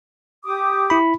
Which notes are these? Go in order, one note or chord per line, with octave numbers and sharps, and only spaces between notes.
G4 D6 D#6
E4 B5